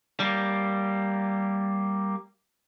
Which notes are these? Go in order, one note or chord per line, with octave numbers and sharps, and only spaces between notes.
G3 A#3